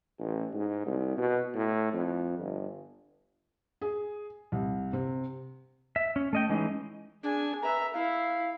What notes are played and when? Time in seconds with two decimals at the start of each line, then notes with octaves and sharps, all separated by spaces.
0.19 A1
0.53 G#2
0.86 C2
1.17 B2
1.54 A2
1.93 F2
2.39 G1
3.81 G#4
4.52 C2
4.93 C3
5.96 E5
6.16 C#4
6.33 A3 D#5 G5
6.49 E3 G#3 C#4 D#4
7.23 D4 G#4 G#5
7.62 B4 E5 A#5
7.94 E4 F5